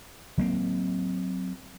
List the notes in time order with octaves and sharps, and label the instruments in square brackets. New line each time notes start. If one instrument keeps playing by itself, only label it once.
[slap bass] F#3 A#3 C4